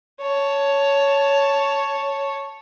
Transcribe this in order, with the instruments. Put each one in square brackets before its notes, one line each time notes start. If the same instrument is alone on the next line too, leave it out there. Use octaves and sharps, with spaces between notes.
[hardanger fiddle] C#5 A5